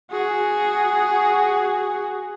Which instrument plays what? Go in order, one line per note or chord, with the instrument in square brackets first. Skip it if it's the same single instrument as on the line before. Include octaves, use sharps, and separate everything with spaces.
[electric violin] F#4 G#4